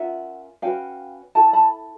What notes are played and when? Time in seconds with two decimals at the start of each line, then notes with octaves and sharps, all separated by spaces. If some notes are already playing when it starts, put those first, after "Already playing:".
Already playing: C#4 F4 A#4 E5 F#5
0.62 C#4 F#4 B4 F5 G5
1.35 E4 A4 G5 A5
1.53 A5 B5